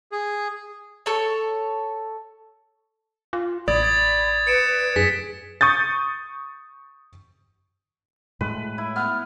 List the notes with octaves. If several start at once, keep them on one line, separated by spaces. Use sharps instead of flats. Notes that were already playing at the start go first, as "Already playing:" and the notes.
G#4
A4 C#5
F4
A1 D5 B5 D#6 G#6 A6
G#6 A6
B4 C#7 D7 E7
F#2 G#4 B6
C#6 D#6 G6 A6
A2 G#3 A3 B4
E4
B3 F6